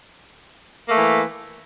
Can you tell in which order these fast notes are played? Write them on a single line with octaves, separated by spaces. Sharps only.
A#3 A3 E3